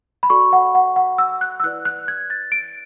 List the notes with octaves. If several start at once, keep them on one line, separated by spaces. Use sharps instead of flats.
B5
F#4 A4 D5 C#6
F#5
F#5
F#5
E6
F#6
E6
E4 B4 D5 F#6
F#6
G#6
A6
D7